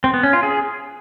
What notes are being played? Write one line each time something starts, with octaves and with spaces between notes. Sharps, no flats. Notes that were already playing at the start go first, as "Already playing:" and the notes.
C4
B3
C#4
F4
G#4